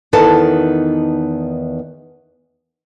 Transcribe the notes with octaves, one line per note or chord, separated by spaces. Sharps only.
E2 D#3 B3 D#4 A4 A5